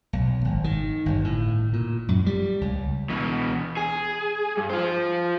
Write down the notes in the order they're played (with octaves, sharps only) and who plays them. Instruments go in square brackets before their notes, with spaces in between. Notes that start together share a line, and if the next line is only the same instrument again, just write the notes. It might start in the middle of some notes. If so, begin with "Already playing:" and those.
[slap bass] B1
G#1
D#3
G1
A2
A#2
F#2
G3
C#2
[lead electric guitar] B2 E3
G#4
G2
F4 C5